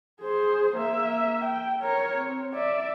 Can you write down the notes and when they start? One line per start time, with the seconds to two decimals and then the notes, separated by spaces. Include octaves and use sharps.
0.22 G#4 C5
0.77 A#3 E5
1.45 G5
1.82 A#4 C#5
2.17 C4
2.54 D5 E5